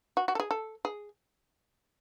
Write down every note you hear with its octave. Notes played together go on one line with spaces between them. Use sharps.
F#4
F#4
A4
G#4
A4
G#4